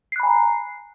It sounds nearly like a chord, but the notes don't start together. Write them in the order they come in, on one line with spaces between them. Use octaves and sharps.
C7 F#6 B5 G#5 A#5